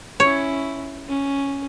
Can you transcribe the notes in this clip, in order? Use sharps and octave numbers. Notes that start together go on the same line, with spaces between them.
C#4 E4 C#5
C#4